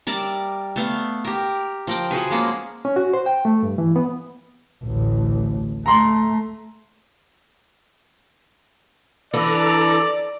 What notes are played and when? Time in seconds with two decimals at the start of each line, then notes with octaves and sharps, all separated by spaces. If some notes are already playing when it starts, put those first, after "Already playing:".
0.07 G3 A#4 D5 E5
0.76 A3 B3 F5
1.25 G4 A#4
1.87 F3 A#4 G5
2.11 F3 F#4 G#4 B4
2.30 G#3 A#3 C#4
2.85 C#4
2.96 F#4
3.13 C5
3.26 G5
3.45 A3
3.63 G2
3.78 E3
3.96 B3
4.84 A1 D2
5.86 A3 A#5 C6
9.34 E3 D4 A4 D5 A#5